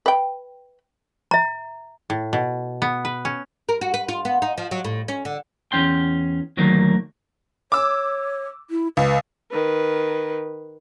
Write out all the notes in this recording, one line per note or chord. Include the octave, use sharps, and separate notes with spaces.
B4 G5
E5 A#5
A2
B2
B3
B4
C#4
A#4
F#4
B4
F4
B3
D#4
F3
F#3
A2
C#4
D3
E2 C#4 G5 C6
D2 D#3 F#3 A3 A#3
C#5 D6 E6
E4
C#2 B4
D#3 B4